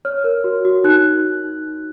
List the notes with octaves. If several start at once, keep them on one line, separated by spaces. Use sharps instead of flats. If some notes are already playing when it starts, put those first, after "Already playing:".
C#5 F6
A#4
F#4
F#4
D#4 F#6